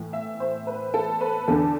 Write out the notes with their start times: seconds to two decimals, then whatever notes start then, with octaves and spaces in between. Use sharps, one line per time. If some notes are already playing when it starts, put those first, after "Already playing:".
Already playing: A2 E3
0.13 E5
0.40 C5
0.67 B4
0.94 A4
1.21 B4
1.48 E2 D3 A4